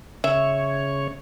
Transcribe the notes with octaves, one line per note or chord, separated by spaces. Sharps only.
C#3 C#5 E5